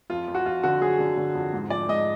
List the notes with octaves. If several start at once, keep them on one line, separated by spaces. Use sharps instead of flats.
F2 F4
F2
F#4
F2 F4
D3 F#4
F#3 G#4
D3
D3
F2
G#2
F3 D5
G#2 D#5